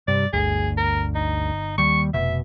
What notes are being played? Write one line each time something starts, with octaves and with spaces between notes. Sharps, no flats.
G2 C3 D5
G1 D2 G#4
A#4
D#4
D#2 G3 C#6
F1 B2 E5